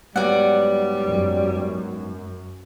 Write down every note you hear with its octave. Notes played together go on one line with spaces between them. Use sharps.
G#2 F#3 G3 B3 D5 F#5
F#2